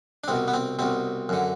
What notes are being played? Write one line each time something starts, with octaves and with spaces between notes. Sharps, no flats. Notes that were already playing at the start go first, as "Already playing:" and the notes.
D4
C2 B2 C4
B3
C4
C2 B2 C4
F#2 D3